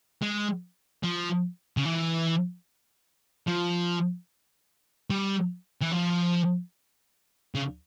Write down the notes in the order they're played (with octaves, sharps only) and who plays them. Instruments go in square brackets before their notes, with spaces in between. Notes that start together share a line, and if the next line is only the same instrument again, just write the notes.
[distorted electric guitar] G#3
F3
C#3
E3
F3
G3
E3
F3
C#3